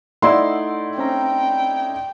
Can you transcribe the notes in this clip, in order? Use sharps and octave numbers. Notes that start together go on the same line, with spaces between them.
A3 D#4 E4 D5 F#5 C6 E6
C4 C#4 G5 A#5